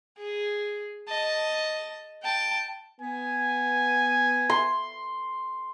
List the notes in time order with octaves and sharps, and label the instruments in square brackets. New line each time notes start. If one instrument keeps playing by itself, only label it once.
[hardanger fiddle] G#4
D#5 A5
G5 A5
[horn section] B3 G#5
[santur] C6